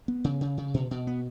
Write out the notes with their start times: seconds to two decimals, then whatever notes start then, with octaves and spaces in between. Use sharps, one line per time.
0.08 B3
0.24 C#3
0.41 C#3
0.58 C#3
0.74 B2
0.91 B2
1.07 B3